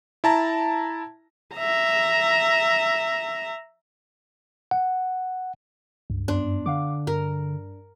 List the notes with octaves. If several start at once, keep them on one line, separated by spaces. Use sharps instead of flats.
E4 A5 A#5
E5 A#5
F#5
C#2 G2
F#2 B3 D4 C6
D3 F5 F#5 D6
G2 A#4